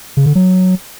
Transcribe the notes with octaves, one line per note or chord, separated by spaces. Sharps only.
C#3
D3
F#3